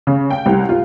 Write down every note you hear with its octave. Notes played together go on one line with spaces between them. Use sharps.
C#3
G5
C2
F4